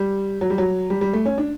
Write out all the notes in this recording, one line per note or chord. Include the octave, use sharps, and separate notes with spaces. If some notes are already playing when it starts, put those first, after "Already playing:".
Already playing: G3
F#3
G3
F#3
G3
G3
A3
C#4
D4